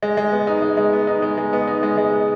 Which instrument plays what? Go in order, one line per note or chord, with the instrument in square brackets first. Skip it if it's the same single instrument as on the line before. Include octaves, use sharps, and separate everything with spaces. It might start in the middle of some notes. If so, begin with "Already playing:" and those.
[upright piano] G#3
G#3
B3
D#4
G#3
G#3
B3
D#4
G#3
G#3
B3
D#4
G#3
G#3
B3